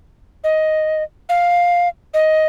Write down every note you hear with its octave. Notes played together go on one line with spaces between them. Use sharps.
D#5
F5
D#5